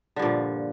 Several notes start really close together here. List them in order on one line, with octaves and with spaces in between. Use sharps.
D3 G2 A#2 F3